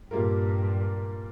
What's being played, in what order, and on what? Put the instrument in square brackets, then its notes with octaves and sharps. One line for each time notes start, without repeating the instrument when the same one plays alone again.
[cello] G2 [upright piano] A#2 G3 A#3 F4 A#4